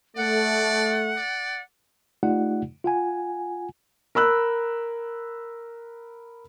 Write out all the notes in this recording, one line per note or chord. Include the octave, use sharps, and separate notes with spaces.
A3 D5 F#5
D5
A3 D#4 F4 G4 D5 F#5
F4 F#5 G#5
A#4 B5 E6 F#6